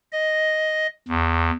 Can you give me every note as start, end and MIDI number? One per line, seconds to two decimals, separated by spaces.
0.13 0.87 75
1.08 1.51 40